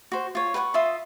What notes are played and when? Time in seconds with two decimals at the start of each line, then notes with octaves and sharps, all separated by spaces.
0.12 F#4 C5
0.35 F4 C#5
0.54 B4 F#5 G5 C#6
0.74 F4 E5 C6 D#6